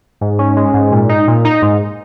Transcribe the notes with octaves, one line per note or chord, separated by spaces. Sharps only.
G#2
C#4
G#3
G#2
A#2
D#4
A#2
D#4
G#2